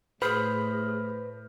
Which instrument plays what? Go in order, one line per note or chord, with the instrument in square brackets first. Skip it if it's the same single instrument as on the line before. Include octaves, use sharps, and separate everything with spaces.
[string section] A2 [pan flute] G#4 [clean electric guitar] B4 C5 [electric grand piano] B5 F6 G6